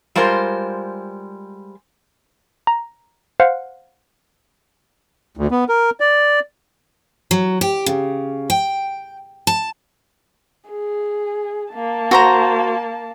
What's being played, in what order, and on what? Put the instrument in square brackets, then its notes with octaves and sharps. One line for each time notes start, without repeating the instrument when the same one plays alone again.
[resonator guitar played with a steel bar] G3 G#3 F4 A#4 C5
[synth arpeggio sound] A#5
C5 F5 F#5
[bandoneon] D2
B3
A#4
D5
[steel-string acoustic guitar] F#3
G4
C#3
G5
A5
[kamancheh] G#4
A#3 A5
[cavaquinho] F#4 C5 A#5